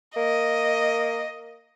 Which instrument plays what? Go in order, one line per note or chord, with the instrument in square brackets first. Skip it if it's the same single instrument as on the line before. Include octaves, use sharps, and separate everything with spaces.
[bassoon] A#3 [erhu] D#5